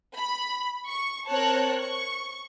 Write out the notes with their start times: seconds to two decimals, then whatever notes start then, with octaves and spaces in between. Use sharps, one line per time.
0.15 B5
0.88 C#6
1.29 C4 A#4 C#5 A5 F#6
1.78 C#6